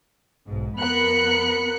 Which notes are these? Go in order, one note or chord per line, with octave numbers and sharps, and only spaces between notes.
B1 G#2
F2 B3 A#4 B5 F#6 C#7